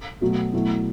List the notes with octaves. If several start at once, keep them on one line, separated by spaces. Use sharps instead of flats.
B2 F#3 A3
B2 F#3 A3 E4